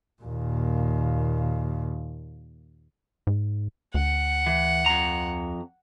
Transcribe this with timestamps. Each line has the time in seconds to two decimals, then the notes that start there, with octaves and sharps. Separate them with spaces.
0.22 D#2 A#2
3.27 G#2
3.94 D2 F#5
4.46 E3
4.86 F2 A#5